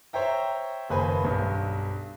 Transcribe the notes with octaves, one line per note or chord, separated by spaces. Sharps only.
C5 C#5 E5 G5 A#5
F#1 D#2 B4 C5 G#5 B5
B1 G2